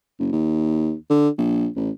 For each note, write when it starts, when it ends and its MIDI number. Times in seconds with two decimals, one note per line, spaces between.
0.19 0.30 30
0.33 0.94 39
1.10 1.29 50
1.38 1.68 34
1.76 1.90 33